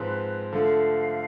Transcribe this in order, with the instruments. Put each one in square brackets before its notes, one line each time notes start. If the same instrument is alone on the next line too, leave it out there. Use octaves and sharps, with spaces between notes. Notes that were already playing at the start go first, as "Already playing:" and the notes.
Already playing: [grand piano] G#2 F3 G#3 C4 [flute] B4
[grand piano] D3 F3 A3 [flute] F5